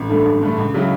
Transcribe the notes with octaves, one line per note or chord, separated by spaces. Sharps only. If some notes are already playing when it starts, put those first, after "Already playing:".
Already playing: A1
G2 D3 A3
A1
G2 D3 A3
C#2
C#3 F#3 C#4 E4